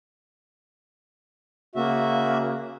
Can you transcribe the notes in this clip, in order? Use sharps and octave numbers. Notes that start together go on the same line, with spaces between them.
C#3 A#3 F#4 E5